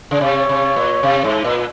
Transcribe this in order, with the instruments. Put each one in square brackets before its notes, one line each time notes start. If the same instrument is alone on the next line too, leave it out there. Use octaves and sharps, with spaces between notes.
[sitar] C#3
[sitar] C3 [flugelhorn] C#5
[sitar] C3
A#2
C3
G#2
A#2